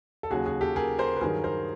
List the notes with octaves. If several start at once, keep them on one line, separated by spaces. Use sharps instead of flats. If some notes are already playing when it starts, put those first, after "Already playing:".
A4
D#2 C#3 F#3 F#4 G#4
F#4 G#4
G4 A4
G#4 A#4
A#4 C5
B4
G2 D#3 F#3 G#4 A#4
A#4 C5